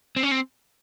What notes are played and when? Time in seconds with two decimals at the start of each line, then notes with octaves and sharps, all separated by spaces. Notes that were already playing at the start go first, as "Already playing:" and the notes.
0.16 C4
0.23 C#4
0.31 C4